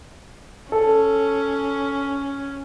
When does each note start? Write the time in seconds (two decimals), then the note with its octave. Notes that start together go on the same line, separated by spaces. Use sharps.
0.72 C#4 A4